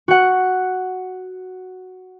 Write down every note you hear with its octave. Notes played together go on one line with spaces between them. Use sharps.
F#4 F#5